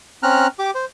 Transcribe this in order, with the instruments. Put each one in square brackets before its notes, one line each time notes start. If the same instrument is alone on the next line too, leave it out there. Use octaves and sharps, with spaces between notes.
[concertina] C4 C#4 A#5 F6 F#6
G4 D6
C5